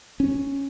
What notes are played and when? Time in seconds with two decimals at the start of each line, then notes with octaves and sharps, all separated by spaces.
0.20 C#4